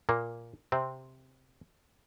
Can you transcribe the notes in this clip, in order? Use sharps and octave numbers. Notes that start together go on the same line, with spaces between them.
A#2 A#3
C3 C4